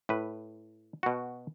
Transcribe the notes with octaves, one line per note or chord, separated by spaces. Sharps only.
A2 B4
B2 F#4